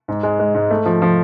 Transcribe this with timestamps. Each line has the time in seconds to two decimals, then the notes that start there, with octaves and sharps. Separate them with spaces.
0.08 G#2
0.23 G#3
0.39 G#3
0.54 G#2
0.70 A3
0.86 F3
1.02 F3